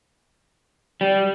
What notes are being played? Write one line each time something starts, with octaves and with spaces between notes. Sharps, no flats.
G3